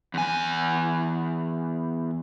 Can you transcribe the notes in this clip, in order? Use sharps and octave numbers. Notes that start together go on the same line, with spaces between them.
E2 G#5